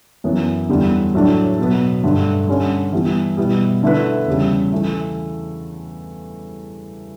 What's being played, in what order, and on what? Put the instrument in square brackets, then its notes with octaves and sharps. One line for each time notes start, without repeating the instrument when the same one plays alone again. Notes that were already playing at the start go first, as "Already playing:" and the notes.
[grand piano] F#2 E3 B3
E2 D3 G3 D4
A2 F#3 A3 D4
B2 F#3 B3
G2 D3 A3
D3 G3 C#4
E3 G3 B3 E4
B2 G3 B3 E4
D3 A3 E4 B4
E2 C#3 G3
E3 A3 E4